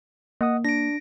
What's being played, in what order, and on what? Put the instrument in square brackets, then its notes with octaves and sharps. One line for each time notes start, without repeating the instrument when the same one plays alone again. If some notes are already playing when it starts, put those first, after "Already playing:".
[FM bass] A#3 [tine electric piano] D#5 F#5 D#6
[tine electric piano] D4 [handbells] A#6 D7